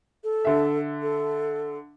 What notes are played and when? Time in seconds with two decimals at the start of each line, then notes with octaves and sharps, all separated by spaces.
0.24 A4
0.45 D3 E5
1.02 A4